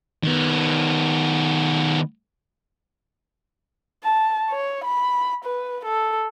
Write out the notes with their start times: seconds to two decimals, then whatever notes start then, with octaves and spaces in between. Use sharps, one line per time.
0.24 D#3 B3
4.04 A5
4.50 C#5
4.85 B5
5.45 B4
5.85 A4